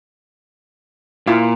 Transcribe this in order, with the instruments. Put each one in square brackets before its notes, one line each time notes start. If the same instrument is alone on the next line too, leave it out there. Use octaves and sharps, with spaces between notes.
[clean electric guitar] A#2 [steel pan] E4 F4